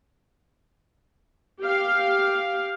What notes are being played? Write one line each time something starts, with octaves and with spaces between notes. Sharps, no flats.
G4 F5